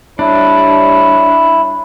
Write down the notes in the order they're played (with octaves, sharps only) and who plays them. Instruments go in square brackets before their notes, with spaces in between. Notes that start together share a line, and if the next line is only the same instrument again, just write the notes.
[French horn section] G3 C#5 [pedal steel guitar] D4 [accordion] E4